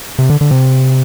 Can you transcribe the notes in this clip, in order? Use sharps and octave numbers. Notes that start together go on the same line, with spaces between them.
C3
D3
D3
C3